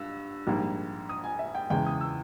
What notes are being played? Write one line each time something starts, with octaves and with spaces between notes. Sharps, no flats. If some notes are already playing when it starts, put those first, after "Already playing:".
Already playing: G2 E6
A#1 G#2 G3 A#3
D#6
G#5
E5
G5
E2 C#3 E3 G#3 G5
D#6
E6